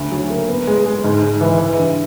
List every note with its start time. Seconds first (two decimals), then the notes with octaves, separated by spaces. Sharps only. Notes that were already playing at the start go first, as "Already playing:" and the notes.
Already playing: D2
0.11 F#3
0.30 A#3
0.49 B3
0.67 G#3
0.86 G#3
1.04 G#2
1.22 G#2
1.41 E3
1.59 E3
1.78 G2